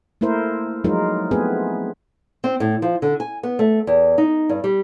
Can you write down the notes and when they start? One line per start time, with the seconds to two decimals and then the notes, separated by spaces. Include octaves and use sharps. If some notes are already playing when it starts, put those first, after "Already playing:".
0.21 A3 A#3 E4 A#4 C5
0.84 F3 F#3 G#3 D#4 F4 A#4
1.31 A3 B3 C4 G#4 B4
2.44 C4
2.60 A2
2.82 F3
3.02 D3
3.20 G#5
3.43 B3
3.59 A3
3.87 E2
4.18 D#4
4.49 G2
4.64 G3